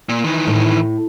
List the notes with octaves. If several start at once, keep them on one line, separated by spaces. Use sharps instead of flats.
A#2
D#3 E3
A2